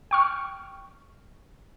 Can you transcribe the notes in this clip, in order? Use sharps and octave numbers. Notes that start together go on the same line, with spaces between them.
G5 C#6 F6